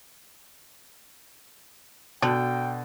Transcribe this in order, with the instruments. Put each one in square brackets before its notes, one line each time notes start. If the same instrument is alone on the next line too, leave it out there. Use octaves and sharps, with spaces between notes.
[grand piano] B2 [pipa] D3 [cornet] G5